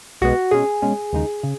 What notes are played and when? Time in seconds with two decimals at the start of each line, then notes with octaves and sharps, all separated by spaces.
0.21 B1 B2 G#3 B3 F#4
0.51 B2 G#3 C#4 G#4
0.82 B2 G#3 C#4
1.13 D#2 C#3 G#3 D#4
1.43 C#3